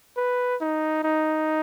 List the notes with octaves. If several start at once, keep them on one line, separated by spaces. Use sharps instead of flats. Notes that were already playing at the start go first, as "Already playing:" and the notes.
B4
D#4
D#4